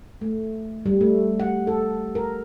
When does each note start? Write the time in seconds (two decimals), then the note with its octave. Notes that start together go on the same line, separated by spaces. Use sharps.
0.21 A3
0.86 G3
1.01 A3
1.40 F#5
1.67 A4
2.15 A#4